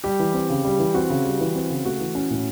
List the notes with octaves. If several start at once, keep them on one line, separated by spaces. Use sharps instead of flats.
G3 G4
E3
C4
C#3
G3
E3
C4 F#4
C#3
G3
E3
C4
C#3
A3 F#4
E3
C#4
A2